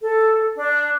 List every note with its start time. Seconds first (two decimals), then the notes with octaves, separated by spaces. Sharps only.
0.01 A4
0.56 D4